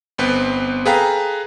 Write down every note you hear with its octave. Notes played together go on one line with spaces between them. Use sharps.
G1 B3 C4 B4
G#4 A4 B4 F5 G5 A#5